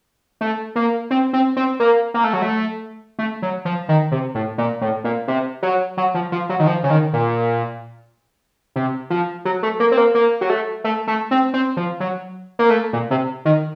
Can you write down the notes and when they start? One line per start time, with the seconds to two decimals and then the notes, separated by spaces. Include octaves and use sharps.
0.41 A3
0.76 A#3
1.11 C4
1.33 C4
1.57 C4
1.80 A#3
2.14 A#3
2.24 A3
2.33 F#3
2.42 A3
3.19 A3
3.42 F#3
3.65 F3
3.89 D#3
4.12 C3
4.35 A2
4.58 A#2
4.81 A2
5.04 A#2
5.28 C3
5.63 F#3
5.97 F#3
6.14 F3
6.32 F3
6.49 F#3
6.59 D#3
6.67 F3
6.84 C#3
6.90 D#3
7.13 A#2
8.76 C3
9.10 F3
9.45 F#3
9.63 A3
9.80 A#3
9.92 C4
9.97 A#3
10.15 A#3
10.41 F#3
10.50 A3
10.84 A3
11.07 A3
11.31 C4
11.54 C4
11.77 F3
12.00 F#3
12.59 A#3
12.70 A3
12.93 A#2
13.11 C3
13.45 D#3